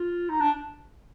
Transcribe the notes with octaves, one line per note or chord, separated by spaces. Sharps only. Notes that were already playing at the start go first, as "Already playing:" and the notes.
Already playing: F4
D#4
D4